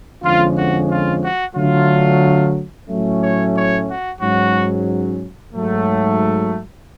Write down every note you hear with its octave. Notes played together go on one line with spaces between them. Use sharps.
F2 D3 F3 G#3 C#4 F4
F#4
F4
F#4
D3 F#3 A3 F4
A2 F#3 A3 C#4
C#5
C#5
F#4
G#2 F#3 C#4 F#4
G#2 F#3 A3